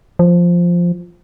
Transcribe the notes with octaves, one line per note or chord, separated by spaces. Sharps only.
F3